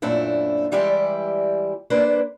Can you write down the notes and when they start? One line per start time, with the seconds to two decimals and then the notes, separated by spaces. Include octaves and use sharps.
0.02 F#2 A#2 A3 C4 D4 E4
0.72 E3 G3 G#3 E4 G4 D5
1.90 A#3 D4 B4 C5